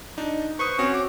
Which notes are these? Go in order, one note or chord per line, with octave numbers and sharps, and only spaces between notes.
D4 D#4
B4 C5 C#6 D#6
C4 C#4 F#4 C5
D6